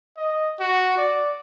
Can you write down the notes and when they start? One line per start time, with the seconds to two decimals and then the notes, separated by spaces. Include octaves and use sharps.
0.17 D#5
0.60 F#4
0.97 D5